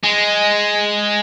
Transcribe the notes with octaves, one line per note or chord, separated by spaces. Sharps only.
G#3